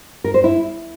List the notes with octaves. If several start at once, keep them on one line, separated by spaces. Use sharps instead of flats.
A#4
C5
E4